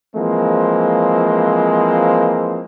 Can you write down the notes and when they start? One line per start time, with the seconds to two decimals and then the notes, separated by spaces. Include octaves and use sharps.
0.16 E3 F3 G#3 A#3 C4